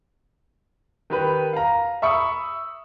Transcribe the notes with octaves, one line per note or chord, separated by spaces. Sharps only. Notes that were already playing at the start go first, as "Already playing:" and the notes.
D#3 G4 B4
F5 A#5
E5 B5 C#6 D#6 E6 C#7